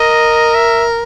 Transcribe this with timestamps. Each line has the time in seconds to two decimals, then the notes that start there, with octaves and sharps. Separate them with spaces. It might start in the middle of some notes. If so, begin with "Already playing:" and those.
Already playing: A#4 D#5
0.55 E5